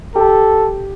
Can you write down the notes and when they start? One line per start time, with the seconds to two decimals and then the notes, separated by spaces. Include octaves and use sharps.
0.15 G4 A4